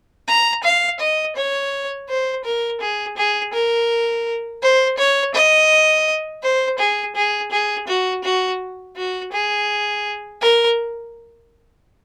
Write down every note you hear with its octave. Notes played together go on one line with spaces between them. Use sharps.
A#5
F5
D#5
C#5
C5
A#4
G#4
G#4
A#4
C5
C#5
D#5
C5
G#4
G#4
G#4
F#4
F#4
F#4
G#4
A#4